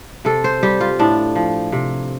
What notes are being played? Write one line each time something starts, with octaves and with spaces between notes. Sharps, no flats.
C3 A4
C5
G3 G4
F4
A2 D4
F3
C3